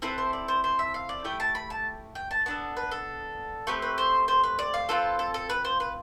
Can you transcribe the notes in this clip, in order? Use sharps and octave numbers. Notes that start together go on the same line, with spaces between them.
C4 E4 A4 B4
C5
D5
C5
C5
E5
F5
D5
A3 E4 G4 G5
A5
B5
A5
G5
A5
B3 D4 A4 A5
B4
A4
A3 C4 G4 B4
B4
C5
C5
B4
D5
F5
C4 F4 A4 B4
A4
A4
B4
C5
B4